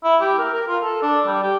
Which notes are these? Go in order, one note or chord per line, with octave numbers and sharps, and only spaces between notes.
E4
G4
A#4
A#4
F4
A4
D4
G3
G4